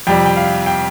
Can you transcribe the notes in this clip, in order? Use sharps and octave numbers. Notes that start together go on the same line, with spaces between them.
F2 C3 G3 G5
G5
F5
G5